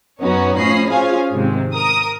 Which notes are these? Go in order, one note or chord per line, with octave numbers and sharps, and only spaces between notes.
F#2 B3 C#4 D#4 F#4 C#5
A2 F3 C#4 D#5 B5 C7
C#4 F4 G#4 C5 F5 G#5
G#2 C3 D#3 G#3 C4
A#4 D#6